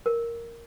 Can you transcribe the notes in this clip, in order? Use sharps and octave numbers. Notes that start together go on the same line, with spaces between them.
A#4